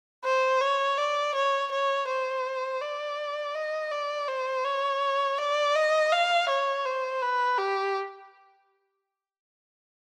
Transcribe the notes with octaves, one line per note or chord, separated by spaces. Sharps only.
C5
C#5
D5
C#5
C#5
C5
D5
D#5
D5
C5
C#5
D5
D#5
F5
C#5
C5
B4
G4